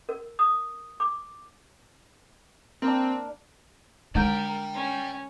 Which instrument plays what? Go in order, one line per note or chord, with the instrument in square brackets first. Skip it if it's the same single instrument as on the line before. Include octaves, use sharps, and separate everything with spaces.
[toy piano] A#4
D#6
D6
[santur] A#3 D4 [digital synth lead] C4
[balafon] D3 G#3 [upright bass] D4 [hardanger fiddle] A#4 [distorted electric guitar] D5 G5
[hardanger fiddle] C#4